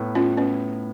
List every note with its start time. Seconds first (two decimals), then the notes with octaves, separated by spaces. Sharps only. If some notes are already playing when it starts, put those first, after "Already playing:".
Already playing: A2 B3
0.15 A2 C#4 F4
0.37 B3 C#4